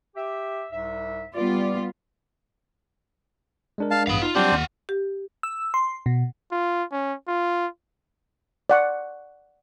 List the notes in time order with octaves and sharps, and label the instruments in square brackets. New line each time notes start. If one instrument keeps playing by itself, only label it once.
[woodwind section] G4 E5
C2 G#2 E5
[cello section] G3 B3 F4 [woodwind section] D5
[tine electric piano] G#3 D4 A#4
[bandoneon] F5 A5
[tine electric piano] A1 G2 D#6 [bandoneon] B3 [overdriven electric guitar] F5 B5
[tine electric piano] D#4 [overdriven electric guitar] F4
[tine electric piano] F#3 G3 G4 [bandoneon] C4 D4 C5 [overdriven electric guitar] F4 F#5
[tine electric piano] D#2
[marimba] G4
[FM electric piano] E6
C6
B2
[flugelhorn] F4
C#4
F4
[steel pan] D5 F#5 C#6